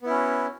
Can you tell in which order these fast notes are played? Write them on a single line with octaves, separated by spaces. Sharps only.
B3 E4 C#4 F#4